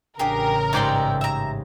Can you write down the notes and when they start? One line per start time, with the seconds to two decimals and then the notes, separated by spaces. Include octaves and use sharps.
0.19 A1 C#3 D4 G4 G#4 A#4
0.73 G#2 D#4 G4 D5 E5 C6
1.21 E5 A#5